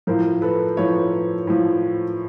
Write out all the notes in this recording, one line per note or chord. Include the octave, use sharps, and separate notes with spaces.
A2 F3 A#4 C5
A4 B4
A2 F3 B4 C#5
A2 F3